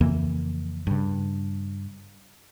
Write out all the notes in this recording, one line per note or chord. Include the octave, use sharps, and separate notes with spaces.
F2 C#3 E3 A#3
G2 C#3